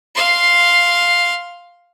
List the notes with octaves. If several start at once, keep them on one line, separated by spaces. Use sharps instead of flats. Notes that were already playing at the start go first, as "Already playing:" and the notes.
F5 C6